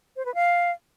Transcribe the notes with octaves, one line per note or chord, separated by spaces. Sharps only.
C5
B4
F5